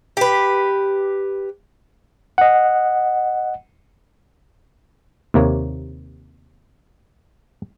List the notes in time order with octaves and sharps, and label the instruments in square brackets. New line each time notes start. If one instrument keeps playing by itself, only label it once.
[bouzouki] G4 B4
[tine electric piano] D#5 F#5
[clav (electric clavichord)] D#2 C3 A#3 C#5